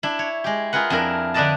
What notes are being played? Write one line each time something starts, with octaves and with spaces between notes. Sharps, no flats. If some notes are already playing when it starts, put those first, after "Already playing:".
D4 E4
C#5
G#3 G4
F4 G#4 A#4 B4 F#5
F2 D4 E4 A#4
D3 D4 B4 D5 D#5 A5